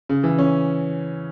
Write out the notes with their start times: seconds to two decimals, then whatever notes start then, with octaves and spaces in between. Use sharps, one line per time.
0.09 C#3
0.24 E3
0.39 C#4